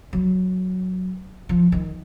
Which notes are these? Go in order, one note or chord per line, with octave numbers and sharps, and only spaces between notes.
F#3
F3
D#3